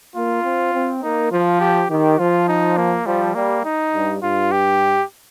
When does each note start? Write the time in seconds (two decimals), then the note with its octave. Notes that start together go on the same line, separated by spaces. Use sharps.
0.16 A#3 F4
0.44 C4
0.74 C4
1.03 A#3 D#4
1.31 F3 F4
1.61 G4
1.90 D#3 G4
2.19 F3 F4
2.48 D#4
2.77 A#3
3.06 F3 G3
3.35 G3 A#3
3.64 D#4
3.94 G2
4.23 G2 F4
4.52 G4